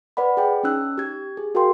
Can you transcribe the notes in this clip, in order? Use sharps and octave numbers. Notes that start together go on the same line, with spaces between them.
B4 D5 F#5 B5
G#4 G5
C#4 D#4 E6 F#6
G4 G#6
G#4
F#4 G#4 A#4 F5 G5 C6